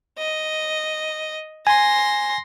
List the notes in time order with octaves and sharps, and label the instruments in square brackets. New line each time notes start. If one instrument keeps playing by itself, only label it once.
[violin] D#5
[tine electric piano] G#5 [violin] C6 A#6